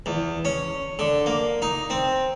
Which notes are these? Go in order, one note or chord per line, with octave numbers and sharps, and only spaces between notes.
E2
C#4
D3
A#3
D#4
C4